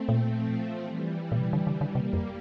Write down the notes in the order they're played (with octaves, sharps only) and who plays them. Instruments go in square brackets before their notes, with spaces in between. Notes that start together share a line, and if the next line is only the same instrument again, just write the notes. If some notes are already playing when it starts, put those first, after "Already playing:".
Already playing: [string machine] A3 C4
[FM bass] A#2
[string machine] F3 A3
E3 G3
[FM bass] A#2
[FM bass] C3 [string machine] E3 G3
[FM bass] D3
D3
D3
[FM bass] C3 [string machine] G3 A#3
[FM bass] F2